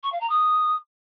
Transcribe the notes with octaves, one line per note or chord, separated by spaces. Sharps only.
C#6
F5
A#5
D#6